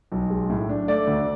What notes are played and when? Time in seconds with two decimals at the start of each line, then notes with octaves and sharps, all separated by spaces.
0.12 B1
0.30 G#3
0.50 A2
0.69 D4
0.88 A3 D5
1.07 D2